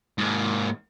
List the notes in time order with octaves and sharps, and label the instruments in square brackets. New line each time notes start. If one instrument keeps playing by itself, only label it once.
[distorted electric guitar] G#2 A#3